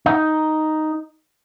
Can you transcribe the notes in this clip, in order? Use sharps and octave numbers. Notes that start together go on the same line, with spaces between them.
D#4